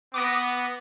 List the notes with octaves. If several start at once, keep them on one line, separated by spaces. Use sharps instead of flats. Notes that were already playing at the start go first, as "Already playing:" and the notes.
B3 D6 D#6 A#6